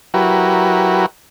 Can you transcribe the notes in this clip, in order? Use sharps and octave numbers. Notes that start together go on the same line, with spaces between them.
F#3 E4 F#4 G4 A#4 B4